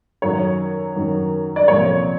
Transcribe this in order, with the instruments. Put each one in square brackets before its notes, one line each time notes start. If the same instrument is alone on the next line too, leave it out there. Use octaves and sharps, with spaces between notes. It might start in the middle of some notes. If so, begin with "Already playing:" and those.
[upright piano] F#2 D#3 F#3 C#5
F#2 D#3 F#3
D5
C2 A#2 F3 C#5